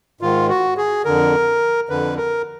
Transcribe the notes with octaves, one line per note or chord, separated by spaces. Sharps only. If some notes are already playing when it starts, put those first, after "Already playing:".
G#2 D#3 F4
F#4
G#4
F2 D3 A#4
F2 D3 B4
A#4